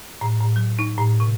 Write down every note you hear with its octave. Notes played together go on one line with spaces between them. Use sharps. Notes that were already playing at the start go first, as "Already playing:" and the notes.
A2
A2
F#3
D#4
A2
C3